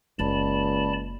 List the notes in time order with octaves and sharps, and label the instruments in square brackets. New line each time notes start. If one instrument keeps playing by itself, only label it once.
[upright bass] F#1 A#3 [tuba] C#2 [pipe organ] D5 A5 B5